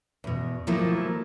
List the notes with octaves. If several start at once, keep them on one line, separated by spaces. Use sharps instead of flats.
E2 B2
D#3 F3 F#3 A3 A#3 E4